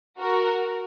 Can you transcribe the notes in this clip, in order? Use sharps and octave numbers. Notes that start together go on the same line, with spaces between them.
F#4 A#4